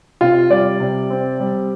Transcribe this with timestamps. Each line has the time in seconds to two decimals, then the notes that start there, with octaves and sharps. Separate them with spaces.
0.21 C3 F4
0.50 G3 D5
0.80 C3
1.10 C4
1.40 G3